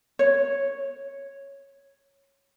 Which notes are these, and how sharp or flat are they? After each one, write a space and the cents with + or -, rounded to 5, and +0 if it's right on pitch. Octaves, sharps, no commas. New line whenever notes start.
C#5 -5